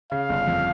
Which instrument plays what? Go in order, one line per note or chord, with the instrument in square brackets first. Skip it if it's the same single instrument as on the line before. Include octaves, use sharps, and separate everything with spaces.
[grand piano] C#3 [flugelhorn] F5
[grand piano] G1
F2